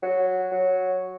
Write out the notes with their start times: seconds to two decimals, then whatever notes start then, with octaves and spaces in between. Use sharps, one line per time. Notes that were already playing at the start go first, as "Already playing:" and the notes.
0.03 F#3
0.52 F#3